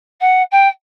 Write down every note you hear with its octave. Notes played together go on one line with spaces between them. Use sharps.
F#5
G5